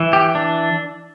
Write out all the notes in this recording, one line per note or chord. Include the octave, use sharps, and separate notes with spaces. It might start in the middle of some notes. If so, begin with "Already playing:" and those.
Already playing: E3
G4
D4